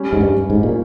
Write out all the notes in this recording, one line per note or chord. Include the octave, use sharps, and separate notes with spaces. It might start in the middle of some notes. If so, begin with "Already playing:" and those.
Already playing: G3 C#4 G4 C#5
G#2
G2
G#2
A#2